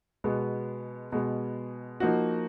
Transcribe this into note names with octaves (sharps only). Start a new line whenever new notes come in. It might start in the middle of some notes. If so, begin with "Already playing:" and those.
B2 G#3 B3
B2 G#3 B3
F3 A#3 D#4 F#4